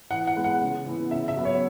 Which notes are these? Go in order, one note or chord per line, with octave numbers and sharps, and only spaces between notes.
E3 F#5
F#5
G#3 B3
F#5
C#3
E3 B3
C#3 E5
E5
F#3 B3
C#5